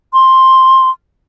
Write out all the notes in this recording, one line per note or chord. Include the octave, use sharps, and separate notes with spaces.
C6